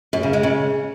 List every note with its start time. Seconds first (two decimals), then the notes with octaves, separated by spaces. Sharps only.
0.13 F#2
0.23 C#3
0.33 G#3
0.43 C#3